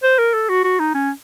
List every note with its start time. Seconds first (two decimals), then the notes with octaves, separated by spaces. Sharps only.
0.03 C5
0.19 A#4
0.34 A4
0.49 F#4
0.64 F#4
0.80 D#4
0.95 C#4